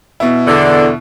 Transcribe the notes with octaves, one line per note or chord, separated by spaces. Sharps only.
B2 E4
E2 D3